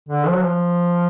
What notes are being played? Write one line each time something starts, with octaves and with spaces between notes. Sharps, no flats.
D3
F3
F#3
F3